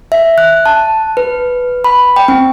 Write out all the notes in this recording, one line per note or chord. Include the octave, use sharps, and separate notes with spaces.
E5
F#6
A5
B4
B5
G5
C4